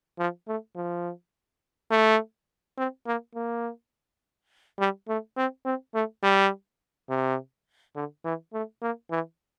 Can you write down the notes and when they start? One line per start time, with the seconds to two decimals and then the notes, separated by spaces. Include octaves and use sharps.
0.19 F3
0.48 A3
0.76 F3
1.91 A3
2.78 C4
3.06 A#3
3.35 A#3
4.79 G3
5.08 A3
5.37 C4
5.65 C4
5.94 A3
6.23 G3
7.10 C3
7.95 D3
8.25 E3
8.53 A3
8.82 A#3
9.11 E3